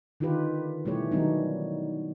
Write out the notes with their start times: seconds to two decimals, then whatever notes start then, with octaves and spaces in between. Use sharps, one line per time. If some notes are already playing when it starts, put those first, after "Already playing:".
0.20 D3 D#3 D#4 F4 G4 B4
0.85 B2 E3 G3 A3 G4 C#5
1.12 D#3 F#3 G3 B3 D4 D#4